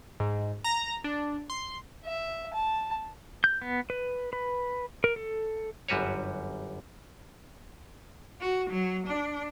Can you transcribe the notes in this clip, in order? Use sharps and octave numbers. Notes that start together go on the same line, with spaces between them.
G#2
A#5
D4
C6
E5
A5
G6
B3
B4
B4
A#4
A4
G1 F#2 G3 F#4 B4 C#5
F#4
F#3
D4